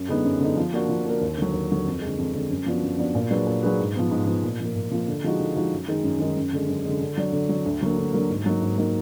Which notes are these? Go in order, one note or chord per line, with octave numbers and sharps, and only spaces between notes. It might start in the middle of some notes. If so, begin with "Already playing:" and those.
Already playing: F#2
D3 G#3 B3 D#4
F#2
D3 G#3 B3 D#4
F3
A#3 D4 F#4 A#4
F3
A#3 D4 F#4 A#4
D#2
D3 F#3
D#2
D3 F#3
F2
D3 G#3
F2
D3 G#3
F#2
F3 B3 D4 F#4
F#2
F3 B3 D4 F#4
A#2
F#3 D4 G#4 B4
A#2
F#3 D4 G#4 B4
G#2
F3 B3
G#2
F3 B3
A#2
F3 A#3
A#2
F3 A#3
D3
F3 G#3 D#4 F#4
D3
F3 G#3 D#4 F#4
F#2
D#3 G#3 D#4 A#4
F#2
D#3 G#3 D#4 A#4
F#2
D3 G#3
F#2
D3 G#3
D3
F#3 D4
D3
F#3 D4
D2
D3 F#3 A#3
D2
D3 F#3 A#3
G#2
F#3 A#3 D#4
G#2
F#3 A#3 D#4